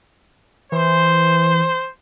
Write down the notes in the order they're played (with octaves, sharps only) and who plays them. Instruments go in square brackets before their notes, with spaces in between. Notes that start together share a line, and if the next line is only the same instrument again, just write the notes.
[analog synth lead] E3 [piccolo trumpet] C5